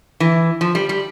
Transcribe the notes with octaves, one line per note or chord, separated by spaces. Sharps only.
E3
F3
G3
G3